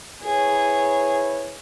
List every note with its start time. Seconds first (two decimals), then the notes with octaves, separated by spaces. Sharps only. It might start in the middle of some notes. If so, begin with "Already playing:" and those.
0.22 E4 G#4 B4 C#5